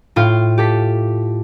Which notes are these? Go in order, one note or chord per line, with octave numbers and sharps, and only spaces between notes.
A2 F4 G5
G4 A4 B6